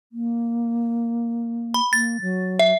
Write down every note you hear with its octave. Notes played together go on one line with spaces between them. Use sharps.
A#3
B5
A#3 A6
F#3
E5